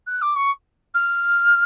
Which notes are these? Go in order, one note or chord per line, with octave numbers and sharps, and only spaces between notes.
F#6
D6
C#6
F6